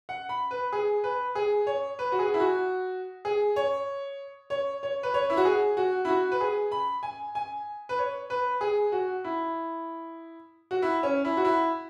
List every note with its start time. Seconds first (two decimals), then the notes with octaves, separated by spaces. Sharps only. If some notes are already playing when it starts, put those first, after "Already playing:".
0.09 F#5
0.29 B5
0.51 B4
0.72 G#4
1.04 B4
1.35 G#4
1.67 C#5
1.99 B4
2.12 F#4
2.19 G#4
2.34 E4
2.40 F#4
3.25 G#4
3.56 C#5
4.50 C#5
4.83 C#5
5.03 B4
5.14 C#5
5.30 E4
5.37 F#4
5.45 G#4
5.77 F#4
6.05 E4
6.09 F#4
6.32 B4
6.41 G#4
6.72 B5
7.03 G#5
7.35 G#5
7.89 B4
7.98 C#5
8.30 B4
8.61 G#4
8.92 F#4
9.24 E4
10.71 F#4
10.82 E4
11.03 C#4
11.25 E4
11.37 F#4
11.45 E4